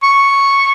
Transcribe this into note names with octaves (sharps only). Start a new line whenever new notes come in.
C#6